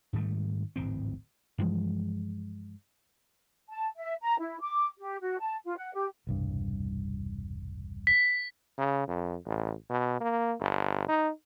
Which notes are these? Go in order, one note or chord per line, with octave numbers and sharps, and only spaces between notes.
G#2 D#3 G3 A3
D1 G#1 E3 C4
G2 E3 F3 G#3
A5
E5
A#5
E4
D6
G4
F#4
A5
F4
F#5
G4
E1 C2 G2
B6
C#3
F2
A1
B2
A#3
G1
D#4